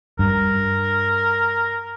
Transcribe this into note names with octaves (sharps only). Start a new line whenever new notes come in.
G2 A#4